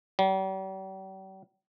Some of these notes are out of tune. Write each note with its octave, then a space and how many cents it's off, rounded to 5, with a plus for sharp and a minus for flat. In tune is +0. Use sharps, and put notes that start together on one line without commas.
G3 -45